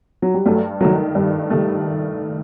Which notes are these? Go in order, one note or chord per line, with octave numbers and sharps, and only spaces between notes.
F#3
G3
G2 F#3 A3
D#3 F#3 A3
G2 G3
D#3 G3 A3